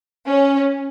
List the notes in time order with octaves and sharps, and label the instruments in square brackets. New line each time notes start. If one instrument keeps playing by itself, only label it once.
[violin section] C#4